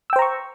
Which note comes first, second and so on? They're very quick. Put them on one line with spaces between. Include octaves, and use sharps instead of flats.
E6 G5 C5 A#5 C#6